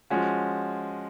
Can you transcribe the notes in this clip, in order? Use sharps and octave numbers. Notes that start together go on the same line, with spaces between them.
F3 G#3 C#4 F#4